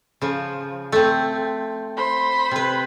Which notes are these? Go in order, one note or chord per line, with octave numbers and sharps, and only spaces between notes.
C#3 F3
A3 C4
C5 B5 C6
C3 B4